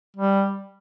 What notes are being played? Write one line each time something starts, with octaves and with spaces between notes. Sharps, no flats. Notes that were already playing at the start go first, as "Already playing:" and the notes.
G3